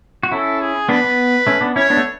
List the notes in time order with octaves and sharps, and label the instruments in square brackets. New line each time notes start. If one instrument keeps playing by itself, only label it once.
[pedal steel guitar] F#4
[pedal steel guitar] C#4 E4 [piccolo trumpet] A4
[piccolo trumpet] G#4
[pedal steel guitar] B3 D4 [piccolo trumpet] B4
[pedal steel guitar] B3
A3 C#4
B3 D4
[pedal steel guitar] C#4 E4 [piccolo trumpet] C#5
[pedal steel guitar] B3 D4
A3